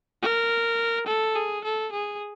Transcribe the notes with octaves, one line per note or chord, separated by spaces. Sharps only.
A#4
A4
G#4
A4
G#4